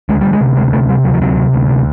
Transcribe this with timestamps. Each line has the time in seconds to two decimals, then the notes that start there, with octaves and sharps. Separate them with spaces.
0.09 D2 G#3
0.21 D2 G3
0.33 G#3
0.40 C3
0.57 D2 G#3
0.73 C3 A3
0.89 C3 G3
1.05 D2 F#3
1.13 F3
1.21 C3 F#3
1.37 C3
1.53 D2
1.69 C3